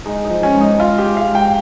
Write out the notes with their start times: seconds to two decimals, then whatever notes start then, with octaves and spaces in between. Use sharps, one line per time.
0.06 G#3 D#4
0.25 D#4
0.30 F3
0.43 C#4
0.54 G#2
0.61 D#4
0.80 G#2 F4
0.98 G4
1.04 G#3
1.17 F5
1.28 G#2
1.35 G5